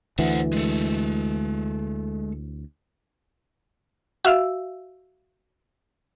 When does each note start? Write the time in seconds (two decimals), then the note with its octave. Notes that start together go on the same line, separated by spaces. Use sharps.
0.19 D2 E3 C5 E5 F#5
0.52 G#3 A4
4.25 F#4 E5 F5 E6